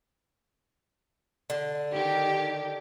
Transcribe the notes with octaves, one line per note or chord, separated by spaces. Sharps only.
D3
D#3 G4